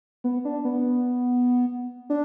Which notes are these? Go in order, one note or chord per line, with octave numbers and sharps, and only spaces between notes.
B3
D4
B3
D4